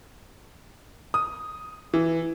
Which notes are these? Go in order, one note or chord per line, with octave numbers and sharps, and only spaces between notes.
D#6
E3